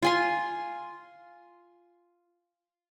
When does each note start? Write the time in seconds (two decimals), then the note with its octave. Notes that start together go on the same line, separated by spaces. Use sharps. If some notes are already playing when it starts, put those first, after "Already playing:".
0.02 F4 G#5 C6